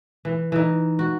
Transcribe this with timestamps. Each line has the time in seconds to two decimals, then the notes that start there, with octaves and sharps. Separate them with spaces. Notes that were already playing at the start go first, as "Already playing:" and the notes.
0.25 E3
0.52 E3 D#4
0.99 F#4